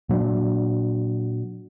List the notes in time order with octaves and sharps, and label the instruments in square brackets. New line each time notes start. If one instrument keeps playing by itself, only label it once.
[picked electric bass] A#2 F#3 C4 D4